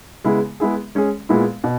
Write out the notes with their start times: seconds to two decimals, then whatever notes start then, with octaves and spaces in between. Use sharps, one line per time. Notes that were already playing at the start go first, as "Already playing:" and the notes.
0.24 C#3 G#3 B3 E4
0.60 G#3 B3 E4 G#4
0.95 G#3 C#4 G#4
1.29 A#2 G#3 B3 E4
1.64 B2